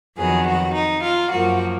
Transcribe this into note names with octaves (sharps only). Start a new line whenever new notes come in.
F2 D#3 F#3 B3 G#4
F#4
D#4
F4
F#2 F3 A#3 F#4